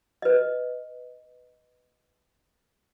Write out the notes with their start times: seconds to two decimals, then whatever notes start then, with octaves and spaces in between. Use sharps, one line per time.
0.22 B4 D#5